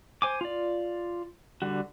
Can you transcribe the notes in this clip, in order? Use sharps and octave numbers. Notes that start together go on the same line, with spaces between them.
C5 G#5 D6
F4 D5
D3 G3 F#4